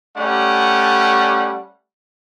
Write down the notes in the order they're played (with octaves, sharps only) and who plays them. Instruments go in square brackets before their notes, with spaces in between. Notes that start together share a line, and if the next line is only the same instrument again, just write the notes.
[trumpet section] G3 A3 C#4 D5 F#5